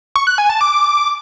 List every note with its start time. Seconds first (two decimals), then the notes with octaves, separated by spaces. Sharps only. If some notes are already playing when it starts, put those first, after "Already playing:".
0.16 C#6
0.27 F#6
0.38 G#5
0.49 A5
0.61 D6